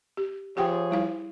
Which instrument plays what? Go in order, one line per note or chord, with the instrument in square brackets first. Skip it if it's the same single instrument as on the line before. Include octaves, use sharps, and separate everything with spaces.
[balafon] G4
[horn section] F3 G#4 C#5 [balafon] G4 F#5 G5
[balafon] G3 E4 F5